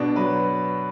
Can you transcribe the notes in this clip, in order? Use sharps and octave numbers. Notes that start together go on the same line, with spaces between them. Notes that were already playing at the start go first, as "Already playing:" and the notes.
Already playing: B2 D4
F#3 B4